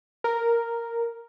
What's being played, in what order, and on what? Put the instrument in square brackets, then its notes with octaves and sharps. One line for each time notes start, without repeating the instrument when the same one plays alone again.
[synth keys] A#4